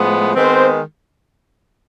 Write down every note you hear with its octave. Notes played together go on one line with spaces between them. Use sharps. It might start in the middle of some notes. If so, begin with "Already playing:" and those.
Already playing: A2 F3 G#3 B3
D#3 G#3 B3 C4 C5